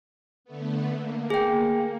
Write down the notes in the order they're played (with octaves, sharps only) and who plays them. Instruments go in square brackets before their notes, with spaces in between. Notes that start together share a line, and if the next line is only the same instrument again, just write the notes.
[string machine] D3 A3 B3
A#3
[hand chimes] G#4 G5